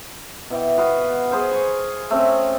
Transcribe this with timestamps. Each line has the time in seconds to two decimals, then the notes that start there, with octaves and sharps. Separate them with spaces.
0.50 B2 E3 G5
0.77 B3 F#4 B4 F5
1.31 G#4 B4 C5 F5
1.52 G#5 C6 C#6
2.10 A3 C4 C#4 D#5